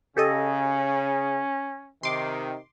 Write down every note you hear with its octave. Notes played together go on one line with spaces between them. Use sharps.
C#3 C#4 G4 A4 D#5
C3 D#3 C6 D6